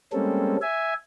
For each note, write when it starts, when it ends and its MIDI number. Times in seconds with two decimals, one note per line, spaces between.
0.13 0.57 55
0.13 0.57 56
0.13 0.57 58
0.13 0.57 60
0.13 0.57 61
0.13 0.57 69
0.62 0.94 76
0.62 0.94 80